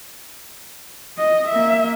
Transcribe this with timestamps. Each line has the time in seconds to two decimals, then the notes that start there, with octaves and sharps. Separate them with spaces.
1.18 D#5
1.49 A#3 E5